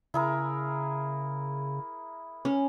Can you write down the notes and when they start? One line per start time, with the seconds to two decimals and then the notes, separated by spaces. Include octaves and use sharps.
0.14 C#3 E4 G#4 A#4
2.45 C#4